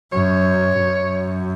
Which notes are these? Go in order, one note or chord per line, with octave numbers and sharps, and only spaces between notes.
F#2 C#5
F#2